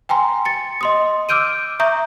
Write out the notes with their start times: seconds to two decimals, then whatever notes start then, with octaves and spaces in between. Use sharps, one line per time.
0.09 G5 G#5 A#5 C6
0.45 A6 C#7
0.81 D#5 C6 D#6
1.29 D6 E6 F6 G6 D7 D#7
1.80 E5 A#5 C#6 D#6 G6